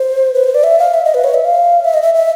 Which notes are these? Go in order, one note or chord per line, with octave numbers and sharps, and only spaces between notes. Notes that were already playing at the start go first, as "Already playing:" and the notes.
Already playing: C5
B4
C5
D5
E5
F5
E5
D#5
B4
C#5
E5
F5
E5
D#5
E5
E5